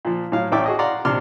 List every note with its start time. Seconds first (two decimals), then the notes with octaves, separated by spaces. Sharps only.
0.05 A#2 F3
0.32 A2 F#3 F5
0.52 A1 A2 D5 E5 G5 D6
0.66 F#4 G#4 D#5
0.79 D5 F5 F#5 A#5 C6
1.05 A#1 C3 D4 C6 D6 F6